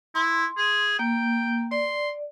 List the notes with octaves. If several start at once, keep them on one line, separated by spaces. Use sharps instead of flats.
E4 C6
G#4
A#3 G5
D5 C6